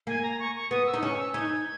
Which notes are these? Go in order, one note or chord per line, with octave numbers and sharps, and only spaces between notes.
A#3 G#5
A#5
C#6
C#6
B3 D#6
E6
D#4
C#4 C#6
E6
D#4 G#6